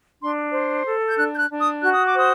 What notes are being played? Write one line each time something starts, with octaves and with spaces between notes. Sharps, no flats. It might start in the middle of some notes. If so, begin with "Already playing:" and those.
D4 C6
C5
A4
G6
D4 F#6
G6
F#6
D4
D#6
F#4 F#6
D#6
D6
C5 D#6